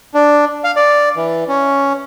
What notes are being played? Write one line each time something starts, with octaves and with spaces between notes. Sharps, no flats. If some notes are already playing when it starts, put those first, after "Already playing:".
D4
F5
D5
E3
C#4